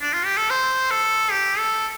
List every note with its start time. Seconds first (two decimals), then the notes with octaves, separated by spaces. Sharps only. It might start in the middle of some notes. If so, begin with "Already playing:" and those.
0.02 D4
0.13 F4
0.25 G4
0.37 A4
0.50 C5
0.91 A4
1.31 G4
1.58 A4